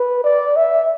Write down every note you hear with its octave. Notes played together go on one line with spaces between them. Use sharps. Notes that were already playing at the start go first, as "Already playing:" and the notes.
Already playing: B4
D5
E5